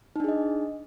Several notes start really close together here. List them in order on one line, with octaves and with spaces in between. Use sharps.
D#4 D4 G#4 D#5